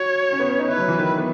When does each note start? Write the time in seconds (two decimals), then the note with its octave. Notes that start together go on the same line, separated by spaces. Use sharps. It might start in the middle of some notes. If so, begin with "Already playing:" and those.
Already playing: F#4 C#5
0.32 C#4
0.40 B3
0.49 C#4
0.59 D#4
0.68 E4 B4
0.78 F#3
0.88 E3
0.98 D#3
1.18 B3